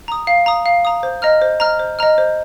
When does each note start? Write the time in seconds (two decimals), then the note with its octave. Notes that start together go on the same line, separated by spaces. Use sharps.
0.08 A#5 D#6
0.27 F5
0.46 A#5 D#6
0.66 F5
0.85 A#5 D#6
1.03 C5
1.22 D#5 A#5 F6
1.42 C5
1.60 D#5 A#5 F6
1.79 C5
1.99 D#5 A#5 F6
2.18 C5